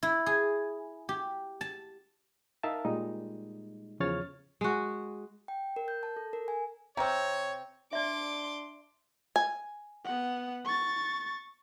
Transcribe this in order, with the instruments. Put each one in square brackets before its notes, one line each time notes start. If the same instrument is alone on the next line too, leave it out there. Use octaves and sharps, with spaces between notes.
[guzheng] E4
G#4
G4
A5
[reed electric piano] D#4 A#4 E5 F5 A5
A#2 G3 G#3 D#4
E2 C#3 F3 C#5 F6 A6
[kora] G#3 F#4
[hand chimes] G5
A#4
G6
A5
A4
A#4
G#5
[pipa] C3 C4 [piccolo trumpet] C#5 [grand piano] A#5
[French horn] D4 [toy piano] D5 E5 [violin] C6 D6
[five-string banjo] G#5
[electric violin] B3 F#5
C#6 A6